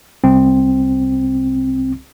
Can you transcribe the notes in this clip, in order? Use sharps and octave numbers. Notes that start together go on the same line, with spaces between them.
C2 C4